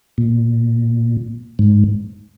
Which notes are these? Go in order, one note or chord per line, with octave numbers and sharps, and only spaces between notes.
A#2
G#2